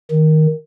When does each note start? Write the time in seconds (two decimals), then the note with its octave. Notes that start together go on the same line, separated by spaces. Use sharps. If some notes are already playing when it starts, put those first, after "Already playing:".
0.11 D#3